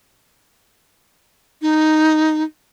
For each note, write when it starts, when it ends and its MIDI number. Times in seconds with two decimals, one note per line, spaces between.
1.62 2.43 63